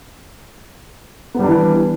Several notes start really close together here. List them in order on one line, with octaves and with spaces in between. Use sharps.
B3 G3 D4 E3